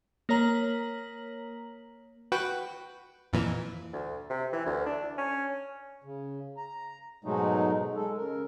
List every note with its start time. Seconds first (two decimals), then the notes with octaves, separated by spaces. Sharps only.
0.29 A#3 A#4 C#5 A#5 B6 F#7
2.32 F#4 B4 G5
3.33 F2 A#2 E3
3.93 D2
4.29 C3
4.53 E3
4.66 D2
4.86 D4
5.18 C#4
6.04 C#3
6.57 A#5
7.25 G#2 B2 F#3 G#3 A3 D#4
7.96 G#3 A4
8.17 C#3 A#4